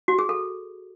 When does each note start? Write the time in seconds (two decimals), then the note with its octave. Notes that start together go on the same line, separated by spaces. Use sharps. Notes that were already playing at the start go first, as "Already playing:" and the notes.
0.08 F#4
0.19 G#4
0.29 A4